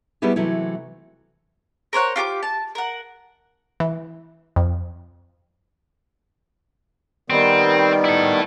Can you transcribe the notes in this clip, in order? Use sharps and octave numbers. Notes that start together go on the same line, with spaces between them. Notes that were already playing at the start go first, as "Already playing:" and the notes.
G3 A3 B3 E4 G4 G#4
C3 E3 F#3 A3 E4
A#4 C5 C#5 F#5
F4 G4 A5 D6
A5
A#4 F#5
E3
F2
D#3 G3 B3 C4
E4 A4